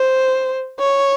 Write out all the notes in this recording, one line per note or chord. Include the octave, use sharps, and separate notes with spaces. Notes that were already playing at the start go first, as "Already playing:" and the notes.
Already playing: C5
C#5